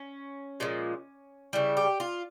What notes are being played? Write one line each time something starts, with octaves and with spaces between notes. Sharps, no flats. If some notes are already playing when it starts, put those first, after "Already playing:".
Already playing: C#4
A#2 F3 G#3
C#3 G3 E4
G4
F4